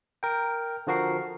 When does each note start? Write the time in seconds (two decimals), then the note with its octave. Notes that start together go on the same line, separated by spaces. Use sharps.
0.23 A#4 G5
0.87 D3 F3 F#4 A#4 C7